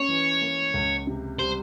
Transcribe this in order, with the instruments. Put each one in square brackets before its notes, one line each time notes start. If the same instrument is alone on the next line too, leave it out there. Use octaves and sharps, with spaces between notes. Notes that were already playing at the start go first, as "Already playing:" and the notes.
Already playing: [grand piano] A#3 C#4 [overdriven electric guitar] C#5
[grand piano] E3
A#3
C#2
C3
[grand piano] G3 [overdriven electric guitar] C5